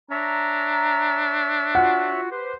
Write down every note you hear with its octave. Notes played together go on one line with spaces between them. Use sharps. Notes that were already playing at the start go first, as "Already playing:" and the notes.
D4 C#5 E5 A#5
F4 F#4 F#5
G4 B4 C5